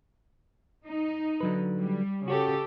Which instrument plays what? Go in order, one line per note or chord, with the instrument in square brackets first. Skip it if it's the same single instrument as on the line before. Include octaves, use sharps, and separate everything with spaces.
[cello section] D#4
[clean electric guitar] D3 F#3 B4
[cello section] G3
[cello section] C#3 G4 A4 [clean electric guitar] F#4 C#5